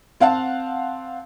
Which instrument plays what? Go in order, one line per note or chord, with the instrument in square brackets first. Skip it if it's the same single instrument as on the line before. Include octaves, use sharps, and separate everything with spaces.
[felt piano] C4 F5 F#5 A5